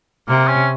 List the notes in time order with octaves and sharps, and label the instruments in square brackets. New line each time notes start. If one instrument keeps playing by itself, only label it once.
[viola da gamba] C3 [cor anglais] A#3
[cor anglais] C#4